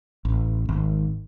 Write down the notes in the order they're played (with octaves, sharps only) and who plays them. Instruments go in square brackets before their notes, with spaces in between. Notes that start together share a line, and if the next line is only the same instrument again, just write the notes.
[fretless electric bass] A1
G#1